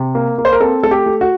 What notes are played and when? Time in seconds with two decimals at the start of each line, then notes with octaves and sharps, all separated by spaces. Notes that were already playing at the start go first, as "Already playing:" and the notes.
Already playing: C3
0.15 A#3
0.38 A#3
0.45 C5
0.53 A#4
0.60 C4 A4
0.83 A3 A4
0.91 G4
1.06 A3
1.21 F#4